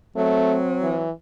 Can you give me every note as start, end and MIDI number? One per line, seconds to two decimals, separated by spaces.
0.16 1.09 54
0.16 0.57 57
0.16 1.01 60
0.82 1.11 52